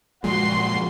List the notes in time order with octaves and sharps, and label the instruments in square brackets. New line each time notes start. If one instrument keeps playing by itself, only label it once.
[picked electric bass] F#1 F3 G#3 [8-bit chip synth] A#2 [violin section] F#4 C6